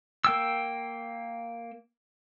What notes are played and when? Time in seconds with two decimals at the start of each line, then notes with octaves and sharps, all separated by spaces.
0.25 A#3 G5 E6